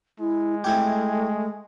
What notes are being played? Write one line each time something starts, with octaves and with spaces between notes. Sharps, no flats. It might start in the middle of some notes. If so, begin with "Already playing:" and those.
G#3 E4
A3 C4 E4 G4